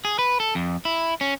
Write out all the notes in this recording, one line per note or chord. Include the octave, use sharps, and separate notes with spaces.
G#4
B4
A4
F2
E4
C#4